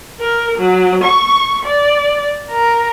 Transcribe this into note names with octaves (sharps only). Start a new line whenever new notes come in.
A#4
F#3
C#6
D5
A#4